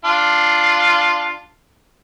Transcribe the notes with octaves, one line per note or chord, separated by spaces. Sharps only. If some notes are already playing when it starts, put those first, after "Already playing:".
D4 F4